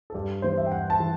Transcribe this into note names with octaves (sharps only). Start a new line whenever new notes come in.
A4
G2 G4
E3 B3 C5
E5
G5
G2 F#5
A5
E3